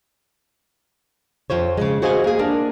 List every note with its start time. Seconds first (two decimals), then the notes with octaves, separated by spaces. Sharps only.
1.50 F2 F4 C5 C#5
1.77 C#3 G#3
2.02 F#4 G#4 C5 D#5 F5 G#5
2.24 A#3 G#4
2.39 A#3 D4 A#4